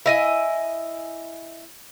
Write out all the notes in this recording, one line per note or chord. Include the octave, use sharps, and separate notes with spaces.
E4 D#5 G#5